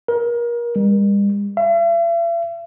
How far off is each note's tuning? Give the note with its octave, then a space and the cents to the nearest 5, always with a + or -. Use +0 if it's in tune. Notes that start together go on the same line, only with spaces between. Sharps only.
A#4 +30
G3 +45
E5 +45